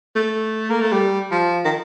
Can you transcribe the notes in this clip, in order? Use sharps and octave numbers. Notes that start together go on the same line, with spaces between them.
A3
A#3
A3
G3
F3
D#3